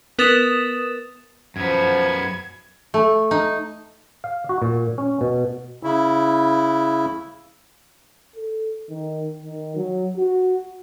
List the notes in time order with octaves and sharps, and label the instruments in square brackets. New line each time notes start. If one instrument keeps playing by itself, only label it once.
[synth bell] B3 A#4 B4 D#6 A6 E7
[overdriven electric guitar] F#2 B3 [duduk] F3 [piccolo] G#6
[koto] A3
D#4
[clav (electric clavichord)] F5
F#4
A#2
C#4
B2
[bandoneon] C#3 E4
[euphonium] A4
D#3
D#3
F#3
F#4